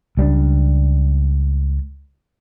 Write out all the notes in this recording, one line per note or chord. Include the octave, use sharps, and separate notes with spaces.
C#2 G3 C4 D4